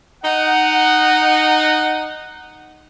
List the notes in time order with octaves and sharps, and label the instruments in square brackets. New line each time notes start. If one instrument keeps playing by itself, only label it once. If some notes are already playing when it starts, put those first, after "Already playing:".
[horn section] D#4 F#5